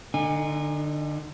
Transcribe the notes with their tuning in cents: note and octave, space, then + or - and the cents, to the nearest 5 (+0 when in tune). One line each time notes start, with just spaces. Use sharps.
D3 +25 D#4 +0 G#5 -25